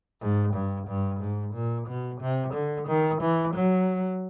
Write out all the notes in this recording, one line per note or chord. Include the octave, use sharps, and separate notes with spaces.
G#2
G2
G2
G#2
A#2
B2
C3
D3
D#3
E3
F#3